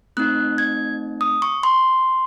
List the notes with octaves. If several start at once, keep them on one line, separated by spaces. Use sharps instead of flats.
A3 C4 D#4 F#6
G#6
D#6
C#6
C6